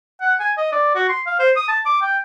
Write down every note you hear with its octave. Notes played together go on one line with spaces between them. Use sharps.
F#5
G#5
D#5
D5
F#4
C6
F5
C5
D#6
A5
D6
G5